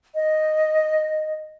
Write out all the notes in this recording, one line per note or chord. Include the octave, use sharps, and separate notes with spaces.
D#5